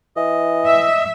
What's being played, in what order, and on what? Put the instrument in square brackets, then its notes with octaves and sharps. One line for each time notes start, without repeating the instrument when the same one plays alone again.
[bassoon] E3 [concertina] D#5
[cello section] E5